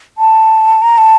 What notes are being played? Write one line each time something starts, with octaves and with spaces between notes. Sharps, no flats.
A5
A#5
A5